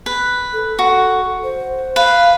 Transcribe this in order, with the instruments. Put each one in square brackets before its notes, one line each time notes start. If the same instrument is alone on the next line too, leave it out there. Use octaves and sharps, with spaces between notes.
[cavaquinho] B4
[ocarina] A4
[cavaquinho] F#4
[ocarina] C5
[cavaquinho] B4 [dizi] F5